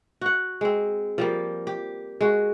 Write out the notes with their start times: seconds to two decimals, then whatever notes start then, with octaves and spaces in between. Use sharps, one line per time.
0.21 F#4 F#5
0.61 G#3 C4
1.18 F3 G3 A#3
1.67 G4
2.21 G#3 F#4